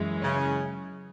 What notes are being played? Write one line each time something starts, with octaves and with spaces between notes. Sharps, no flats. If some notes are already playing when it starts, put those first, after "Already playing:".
Already playing: F#2 E3 G#3
C#3 C#4